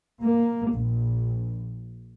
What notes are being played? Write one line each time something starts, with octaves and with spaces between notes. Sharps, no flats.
A#3
A#1